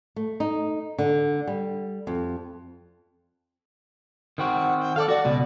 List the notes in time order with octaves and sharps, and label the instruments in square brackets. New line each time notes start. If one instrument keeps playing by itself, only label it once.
[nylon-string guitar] A3
D#4
D3
G3
F2
[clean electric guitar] D#3 C4 F#4
[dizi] F#5
G5
[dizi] A4 [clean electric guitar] D5 F5
[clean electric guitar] F#4 [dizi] D5
[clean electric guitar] C#2 B2